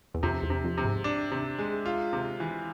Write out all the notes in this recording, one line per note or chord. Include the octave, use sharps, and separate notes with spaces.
E2
F2 C3
E2
C3
F2
C3
G#2
D4
C3
G#3
F4
C3
E3